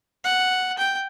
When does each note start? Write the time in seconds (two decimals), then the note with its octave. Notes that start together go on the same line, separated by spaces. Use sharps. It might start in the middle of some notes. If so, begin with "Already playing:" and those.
0.24 F#5
0.78 G5